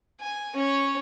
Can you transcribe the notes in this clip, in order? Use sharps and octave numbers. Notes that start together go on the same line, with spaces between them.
G#5
C#4 C#5